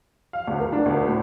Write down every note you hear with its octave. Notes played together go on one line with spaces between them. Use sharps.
F5
D2
A#4
D4
D2
A2